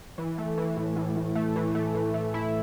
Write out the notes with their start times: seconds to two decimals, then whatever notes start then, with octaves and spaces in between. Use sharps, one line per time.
0.18 E3
0.38 A3
0.58 E3
0.77 A2
0.96 A2
1.16 A2
1.35 A3
1.56 E3
1.75 A3
1.95 E3
2.14 A3
2.34 E4